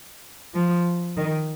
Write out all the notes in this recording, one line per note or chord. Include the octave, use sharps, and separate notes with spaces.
F3
D#3